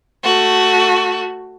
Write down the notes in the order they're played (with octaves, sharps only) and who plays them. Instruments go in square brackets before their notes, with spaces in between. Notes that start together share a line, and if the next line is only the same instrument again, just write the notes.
[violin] A3 F#4